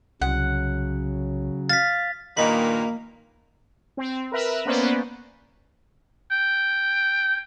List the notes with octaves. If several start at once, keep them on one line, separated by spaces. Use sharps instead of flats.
C2 C#3 F#3 F#5
F5 A6 B6
G2 A#2 D#3 A#3 D#4 B5
C4
A#4 B4 E5
A#3 B3 C#4 B4 C5 D5
G5